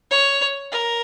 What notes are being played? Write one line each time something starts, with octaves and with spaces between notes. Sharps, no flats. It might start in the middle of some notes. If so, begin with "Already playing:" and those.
C#5
A#4